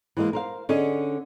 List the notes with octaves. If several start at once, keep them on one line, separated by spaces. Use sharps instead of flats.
E3 G#3 A#3
A#4 C5 F5
D3 C#4 G#4 D#5